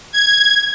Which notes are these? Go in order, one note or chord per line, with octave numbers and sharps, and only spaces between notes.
G#6